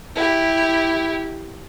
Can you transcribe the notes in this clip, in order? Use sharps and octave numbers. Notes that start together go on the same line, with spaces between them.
E4 G4